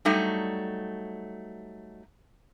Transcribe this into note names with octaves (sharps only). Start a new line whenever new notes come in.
F#3 G3 A3 D#4